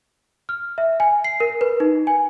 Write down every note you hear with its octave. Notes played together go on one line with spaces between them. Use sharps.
F6
E5
G#5
C7
A#4
B4
D#4
G#5